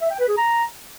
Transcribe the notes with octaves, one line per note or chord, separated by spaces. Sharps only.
E5
G5
B4
G#4
A#5